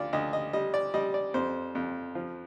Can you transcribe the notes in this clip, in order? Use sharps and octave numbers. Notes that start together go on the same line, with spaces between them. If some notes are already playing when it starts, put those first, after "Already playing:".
Already playing: D2 F4 D5
D2 D#5
D#5
G3 D#5
D5
G3 D#5
D5
F2 C5
F2
F3